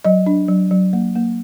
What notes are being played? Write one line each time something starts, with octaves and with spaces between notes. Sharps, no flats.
F#3 D#5
D4
F#3
F#3
A#3
A#3